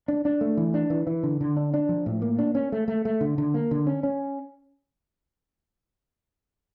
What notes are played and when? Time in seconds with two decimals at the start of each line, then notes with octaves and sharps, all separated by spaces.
0.08 D4
0.25 D4
0.41 A3
0.57 E3
0.74 D4
0.90 E3
1.07 E3
1.23 D3
1.41 D3
1.57 D4
1.74 D4
1.89 F3
2.06 A2
2.22 A#3
2.39 D4
2.55 C#4
2.72 A3
2.88 A3
3.05 A3
3.21 D3
3.38 D3
3.54 A#3
3.71 D3
3.87 C#4
4.03 C#4